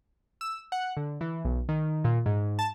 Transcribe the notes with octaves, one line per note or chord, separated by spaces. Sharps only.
E6
F#5
D3
E3
B1
D#3
A#2
G#2
A5